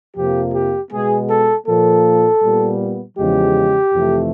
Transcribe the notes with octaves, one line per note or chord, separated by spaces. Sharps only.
F2 C3 F3 A#3 G4
G4
B2 G#3 B3 G#4
A4
A#2 F3 A#3 A4
A#2 G3 B3
E2 C#3 F3 G#3 G4
F2 C3 E3 A3